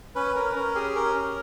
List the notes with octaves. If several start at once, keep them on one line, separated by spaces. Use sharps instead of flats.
C#4 B4
C#4 A#4
B4
C#4 A#4
G4 G#4
C#4 A#4
C#4